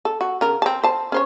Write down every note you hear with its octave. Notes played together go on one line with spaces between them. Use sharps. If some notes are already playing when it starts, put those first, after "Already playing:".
A4
F#4
C#3 A#4
C4 A5
C5 A5
C#4 C5 C#5